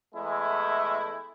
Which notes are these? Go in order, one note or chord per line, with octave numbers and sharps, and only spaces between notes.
E2 G#3 A3 E4